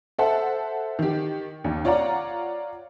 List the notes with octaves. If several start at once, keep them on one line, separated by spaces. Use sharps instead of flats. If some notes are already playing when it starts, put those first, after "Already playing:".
A4 C5 E5 F#5 A5
D#3 G4
D#2
F4 C#5 D5 F#5 A#5